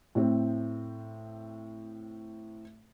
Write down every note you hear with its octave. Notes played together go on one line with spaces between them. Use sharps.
A2 C4